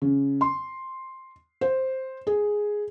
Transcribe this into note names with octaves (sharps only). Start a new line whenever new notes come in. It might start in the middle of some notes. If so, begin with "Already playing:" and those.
C#3
C6
C5
G#4